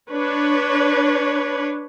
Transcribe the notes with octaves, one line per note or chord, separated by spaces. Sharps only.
D4 B4 C#5